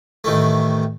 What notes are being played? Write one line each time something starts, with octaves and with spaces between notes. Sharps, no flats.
A1 A2 D#3 A3